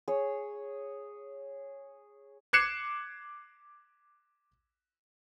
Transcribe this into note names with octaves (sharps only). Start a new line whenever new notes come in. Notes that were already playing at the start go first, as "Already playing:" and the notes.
G#4 C#5
D6 F#6 G#6 C7 C#7 E7